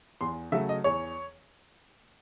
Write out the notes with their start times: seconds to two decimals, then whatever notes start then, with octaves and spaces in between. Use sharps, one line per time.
0.21 E2 C6
0.52 C#3 F#3 A3 E5
0.69 D#5
0.84 E2 C#5